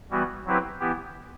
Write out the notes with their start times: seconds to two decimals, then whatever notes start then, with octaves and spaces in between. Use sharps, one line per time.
0.11 E3 G3 B3 F#4
0.45 F#3 C4 E4 G4 B4
0.80 E3 B3 E4 G4